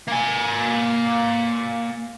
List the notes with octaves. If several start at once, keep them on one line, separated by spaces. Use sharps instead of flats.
A#3 G#5